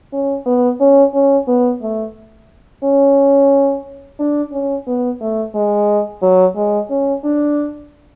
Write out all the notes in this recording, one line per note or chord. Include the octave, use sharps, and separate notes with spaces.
C#4
B3
C#4
C#4
B3
A3
C#4
D4
C#4
B3
A3
G#3
F#3
G#3
C#4
D4